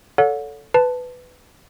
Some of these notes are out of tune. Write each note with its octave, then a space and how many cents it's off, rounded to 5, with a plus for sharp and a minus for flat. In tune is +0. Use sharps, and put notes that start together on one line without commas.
A4 +0 C#5 +40 F#5 -40
B4 +15 A5 +0